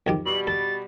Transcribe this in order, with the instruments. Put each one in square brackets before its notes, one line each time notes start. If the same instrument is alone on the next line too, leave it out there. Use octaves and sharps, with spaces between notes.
[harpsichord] F2 D#3 G4
[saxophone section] B2 G3 [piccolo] F#7
[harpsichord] A4 [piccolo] A6